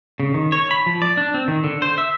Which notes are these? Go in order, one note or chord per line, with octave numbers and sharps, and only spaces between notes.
C#3
D#3
C#5
B5
F3
D5
D4
C4
D#3
D3
C5
E5